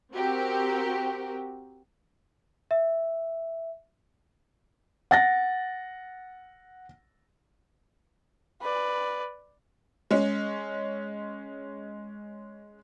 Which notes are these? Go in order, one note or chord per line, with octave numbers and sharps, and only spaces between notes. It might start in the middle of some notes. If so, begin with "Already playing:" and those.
C4 F#4 G4 A#4
E5
F#5 A6 A#6
B4 D5
G#3 C#4